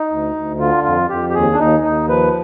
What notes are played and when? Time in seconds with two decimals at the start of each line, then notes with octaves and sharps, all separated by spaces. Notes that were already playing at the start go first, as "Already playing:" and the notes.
Already playing: D#4
0.10 D2
0.35 D2
0.59 D3 F4
0.84 F2 F4
1.09 F2 G4
1.30 G4
1.34 D#2 G#4
1.53 D4
1.59 D#2 D#4
1.84 D#2 D#4
2.08 F3 B4